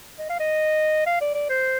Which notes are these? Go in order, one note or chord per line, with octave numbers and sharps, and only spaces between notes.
D#5
F5
D#5
F5
D5
D5
C5